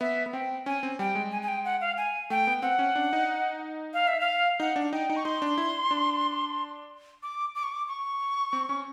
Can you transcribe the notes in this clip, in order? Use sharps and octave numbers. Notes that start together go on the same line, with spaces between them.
B3 E5
B3
C4 G5
C#4 G#5
C4
G3 G5
G#3
G#5
G#5
G5
F#5
F5
G#5
A3 G5
B3
C4 F#5
C#4
D4
D#4
F5
E5
F5
D#4 F#5
D4
D#4 G5
D#4
C#6
D#4 C6
D4
E4
D4
D6
D6
C#6
D6
C#6
C4
C#4